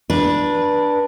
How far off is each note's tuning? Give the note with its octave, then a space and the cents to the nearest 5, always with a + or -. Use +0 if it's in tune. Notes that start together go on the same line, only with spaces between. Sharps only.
D4 +5 B4 -25